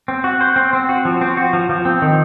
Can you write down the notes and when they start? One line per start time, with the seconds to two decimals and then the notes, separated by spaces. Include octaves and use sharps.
0.08 C4
0.24 F#4
0.41 C5
0.56 C4
0.73 C4
0.89 F#4
1.05 F3
1.21 C4
1.37 F#4
1.53 F3
1.69 F3
1.85 C4
2.02 D#3